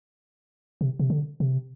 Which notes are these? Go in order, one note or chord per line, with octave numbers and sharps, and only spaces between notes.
C3
C3
D3
C3